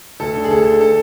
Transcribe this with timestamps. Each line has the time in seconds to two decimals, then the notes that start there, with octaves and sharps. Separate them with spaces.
0.20 D2 A4
0.36 D3
0.44 G#4
0.51 D2 A4
0.66 D3
0.81 A4